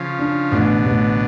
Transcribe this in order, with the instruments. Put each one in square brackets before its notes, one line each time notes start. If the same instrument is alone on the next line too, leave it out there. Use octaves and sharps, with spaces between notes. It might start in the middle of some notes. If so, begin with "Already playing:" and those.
Already playing: [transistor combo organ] C#3 F3
[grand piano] D4
[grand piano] A1 [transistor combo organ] B2 D3
[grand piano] A1